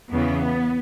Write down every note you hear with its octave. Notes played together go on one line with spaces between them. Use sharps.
E2 C#3 E3 B3